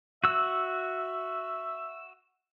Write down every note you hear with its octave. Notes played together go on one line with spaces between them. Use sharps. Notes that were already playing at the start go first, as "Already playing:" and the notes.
F#4 E5 E6